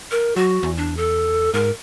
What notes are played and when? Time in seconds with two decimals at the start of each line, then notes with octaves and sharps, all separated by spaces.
0.11 A#4
0.36 F#3 F#4
0.63 E2
0.77 D4
0.97 A4
1.54 G#2 A#4